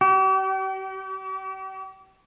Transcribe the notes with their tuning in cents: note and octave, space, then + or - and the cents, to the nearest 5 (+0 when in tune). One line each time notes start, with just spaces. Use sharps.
G4 -40